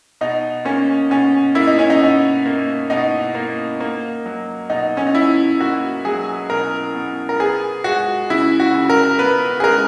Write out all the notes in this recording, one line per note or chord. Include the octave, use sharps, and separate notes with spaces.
B2 D#4
A#3 C#4
B2 C#4
A#3 E4
D#4
C#4
D#4
B2
A#3
B2 D#4
A#3
A#3
F#3
B2 D#4
C#4
D#4
B2 E4
A#3 F#4
F#3 G#4
B2 A#4
B2
A#4
B3 G#4
G#3 F#4
C#3 E4
F#4
C#3
A#4
B3 B4
G#4
G#3 A#4